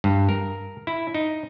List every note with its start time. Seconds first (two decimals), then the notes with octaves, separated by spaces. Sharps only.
0.04 G2
0.29 A#4
0.87 E4
1.14 D#4